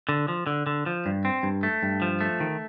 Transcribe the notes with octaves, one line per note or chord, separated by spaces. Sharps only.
D3
F3
D3
D3
F3
G2
C4
G2
A3
G2
F3
A3
D#3